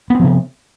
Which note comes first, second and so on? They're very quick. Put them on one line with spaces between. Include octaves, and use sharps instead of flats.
B3 C4 F3 C3